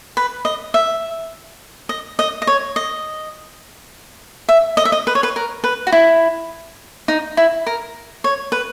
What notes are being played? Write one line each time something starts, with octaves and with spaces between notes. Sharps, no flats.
B4
D#5
E5
D#5
D#5
D#5
C#5
D#5
E5
D#5
E5
D#5
B4
C#5
B4
A#4
B4
F#4
E4
D#4
E4
A#4
C#5
B4